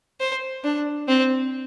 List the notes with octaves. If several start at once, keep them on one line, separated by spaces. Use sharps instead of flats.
C5
D4
C4